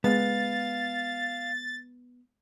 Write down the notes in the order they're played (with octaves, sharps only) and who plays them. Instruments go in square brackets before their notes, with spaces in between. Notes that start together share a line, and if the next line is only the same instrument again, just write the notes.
[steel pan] G#3 [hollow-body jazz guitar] B3 [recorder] F5 [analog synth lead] A6